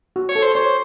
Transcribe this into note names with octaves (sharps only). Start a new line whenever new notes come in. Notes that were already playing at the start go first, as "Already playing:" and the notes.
F#4
C#5
A4
C5
C5 C#5